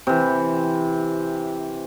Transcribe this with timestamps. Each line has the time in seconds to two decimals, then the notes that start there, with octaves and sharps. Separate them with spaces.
0.07 C3 E3